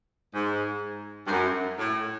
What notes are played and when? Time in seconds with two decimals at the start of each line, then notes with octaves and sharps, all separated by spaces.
0.34 G#2
1.26 G2
1.31 F#2
1.79 A2